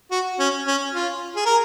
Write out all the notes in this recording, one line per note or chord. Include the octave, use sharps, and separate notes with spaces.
F#4
C#4
C#4
F4
G#4
A#4